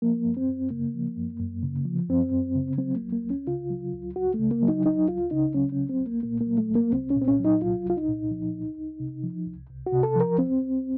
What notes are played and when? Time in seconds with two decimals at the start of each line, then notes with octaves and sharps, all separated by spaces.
0.02 F3 A#3
0.25 F#2
0.37 C4
0.48 F#2
0.71 C#3 A#3
0.94 F3
1.17 F#2
1.40 F#2
1.63 C#3
1.86 F3
2.09 F#2 C4
2.32 F#2
2.55 C#3
2.78 F#3 C4
2.95 A#3
3.01 C#2
3.13 A#3
3.25 C#2
3.30 C#4
3.47 C#3 F4
3.70 F#3
3.94 C#2
4.16 C#2 F#4
4.34 C#3 A3
4.51 A#3
4.62 F#3
4.68 D#4
4.85 C#2 D#4
5.08 C#2 F4
5.31 C#3 D#4
5.54 F#3 C#4
5.72 C#4
5.77 C2
5.89 C4
6.01 C2
6.06 A#3
6.23 A#2 A#3
6.41 A#3
6.46 F#3
6.58 A3
6.69 C2
6.75 A#3
6.92 C2 C4
7.10 C#4
7.16 A#2
7.21 C4
7.28 C#4
7.39 F#3
7.45 D#4
7.62 C2 F4
7.85 C2 F4
7.97 D#4
8.08 A#2
8.31 F3
8.53 C2
8.77 C2
9.00 C3
9.23 F3
9.46 C2
9.70 C2
9.86 F#4
9.92 C3
10.03 A4
10.16 F3 A#4
10.38 C2 C4
10.61 C2